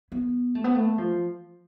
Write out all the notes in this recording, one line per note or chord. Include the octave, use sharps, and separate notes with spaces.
B3
A3
B3
A3
F3